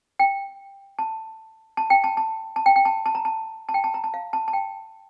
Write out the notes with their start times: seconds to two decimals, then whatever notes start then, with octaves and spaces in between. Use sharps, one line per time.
0.19 G5
0.99 A5
1.77 A5
1.90 G5
2.04 A5
2.17 A5
2.56 A5
2.66 G5
2.76 G5
2.85 A5
3.06 A5
3.15 A#5
3.25 A5
3.69 A5
3.74 G5
3.84 A5
3.94 A#5
4.04 A5
4.14 F5
4.33 A5
4.48 A5
4.53 G5